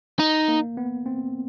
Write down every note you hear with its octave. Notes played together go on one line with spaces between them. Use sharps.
D#4
A#3
B3
C4